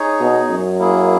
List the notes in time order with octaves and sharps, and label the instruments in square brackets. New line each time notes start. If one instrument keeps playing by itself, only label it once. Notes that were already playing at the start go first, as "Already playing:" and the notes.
Already playing: [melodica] D#4 G#4 C#5
[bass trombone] B2
F#2
[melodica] A#3 E4 G#4